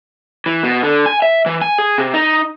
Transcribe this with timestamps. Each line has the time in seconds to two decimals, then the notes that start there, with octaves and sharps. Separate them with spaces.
0.46 E3
0.63 B2
0.83 D3
1.06 G#5
1.22 E5
1.46 E3
1.62 G#5
1.78 G#4
1.98 C3
2.14 D#4